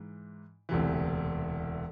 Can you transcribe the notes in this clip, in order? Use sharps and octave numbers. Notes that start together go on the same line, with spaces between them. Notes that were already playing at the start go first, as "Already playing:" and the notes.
Already playing: G#2 E3
E1 D2 C3 E3